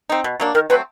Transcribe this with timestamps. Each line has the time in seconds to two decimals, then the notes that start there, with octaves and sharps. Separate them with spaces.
0.09 C4 D#4
0.24 B2
0.40 F#3 A#3 D4
0.54 D#3 A#4
0.70 F#3 A3 C4 B4